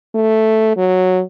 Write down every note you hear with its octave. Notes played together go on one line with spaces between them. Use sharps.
A3
F#3